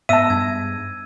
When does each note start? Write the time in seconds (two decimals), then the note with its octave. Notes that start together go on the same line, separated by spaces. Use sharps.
0.09 G#2 B3 E5 A5 E6 A#6 D#7
0.30 G2 G#6